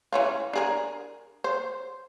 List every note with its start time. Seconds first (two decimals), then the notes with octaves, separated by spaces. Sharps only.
0.13 E3 C#4 F4
0.53 D4 G#4 A#4
1.44 C5